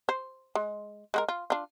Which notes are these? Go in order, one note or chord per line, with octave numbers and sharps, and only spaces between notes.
C5
G#3
G#3 F#4 A#4
F4
D4 F4